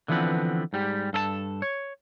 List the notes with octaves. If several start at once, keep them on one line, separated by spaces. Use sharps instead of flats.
D3 E3 F3 B3 C4 B4
G#2 G3 G4
G2 A4 B4 A5
C#5